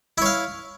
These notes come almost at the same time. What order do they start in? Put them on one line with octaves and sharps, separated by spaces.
E4 C#5 F5